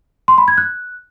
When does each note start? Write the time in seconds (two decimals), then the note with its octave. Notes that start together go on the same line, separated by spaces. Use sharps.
0.28 C6
0.38 B5
0.48 G#6
0.58 F#6